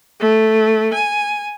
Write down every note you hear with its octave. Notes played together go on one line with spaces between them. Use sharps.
A3
G#5